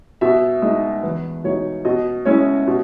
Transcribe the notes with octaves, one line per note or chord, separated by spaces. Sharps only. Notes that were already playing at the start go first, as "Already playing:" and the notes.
B2 E5
G#3 D#4 D#5
E2 B4
B2 G#3 D#4 C#5
B2 D#5
G#3 C#4 E4 C#5
B2